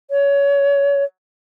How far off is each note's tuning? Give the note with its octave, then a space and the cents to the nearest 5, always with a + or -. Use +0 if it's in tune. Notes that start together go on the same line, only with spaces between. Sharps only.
C#5 +25